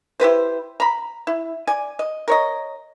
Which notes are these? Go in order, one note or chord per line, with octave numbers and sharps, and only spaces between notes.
E4 G4 B4 C5
A#5 B5
E4
D5 G#5
D#5
A#4 C#5 D#5